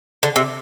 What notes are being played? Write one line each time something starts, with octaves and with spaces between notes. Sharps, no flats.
D3
C3